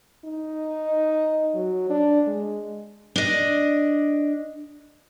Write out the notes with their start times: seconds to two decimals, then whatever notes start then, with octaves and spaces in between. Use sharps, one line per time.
0.25 D#4
1.55 F#3
1.90 D4
2.27 G#3
3.16 D4 D#5